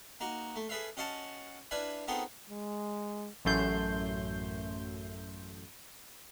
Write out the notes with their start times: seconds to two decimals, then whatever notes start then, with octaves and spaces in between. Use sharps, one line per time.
0.20 A#3 D#4 F#4
0.56 A3
0.69 G#4 A4 B4 E5 F5
0.97 C#4 F#4 D#5 F5 F#5 A5
1.71 D4 E4 B4 E5 F5 G#5
2.08 B3 C4 D#4 F4 G#4 A4
2.49 G#3
3.45 A1 F#2 A3 C6 G6